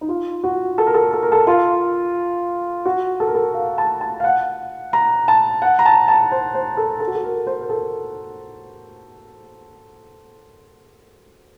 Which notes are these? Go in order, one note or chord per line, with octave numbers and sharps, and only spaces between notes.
D#4
F4
F#4
A4
A#4
A4
A4
A#4
A4
F4
F#4
A4
A#4
A4
F5
A5
A5
F5
F#5
A#5
A5
F#5
A#5
A5
A5
C5
C5
A4
A4
F#4
A4
A#4
C5
A#4
A4